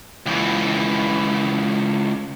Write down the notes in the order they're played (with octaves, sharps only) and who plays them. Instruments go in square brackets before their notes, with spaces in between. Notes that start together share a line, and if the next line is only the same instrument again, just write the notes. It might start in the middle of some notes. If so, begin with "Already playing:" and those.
[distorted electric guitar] C#2 E3